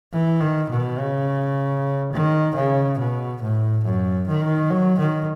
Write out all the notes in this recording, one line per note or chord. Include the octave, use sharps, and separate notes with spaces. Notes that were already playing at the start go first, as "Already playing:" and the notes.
E3
D#3
B2
C#3
D#3
C#3
B2
A2
F#2
D#3
F#3
D#3